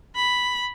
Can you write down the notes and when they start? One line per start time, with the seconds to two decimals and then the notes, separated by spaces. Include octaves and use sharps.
0.16 B5